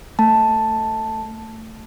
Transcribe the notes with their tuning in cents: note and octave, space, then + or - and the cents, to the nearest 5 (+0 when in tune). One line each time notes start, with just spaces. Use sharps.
A3 +15 A5 +0